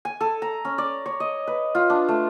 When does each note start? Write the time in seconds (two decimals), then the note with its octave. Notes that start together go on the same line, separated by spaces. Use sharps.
0.05 G#5
0.21 A4
0.42 A#5
0.65 C#4
0.78 D5
1.06 C#5
1.20 D#5
1.47 B4
1.75 F4
1.90 D4
2.09 A3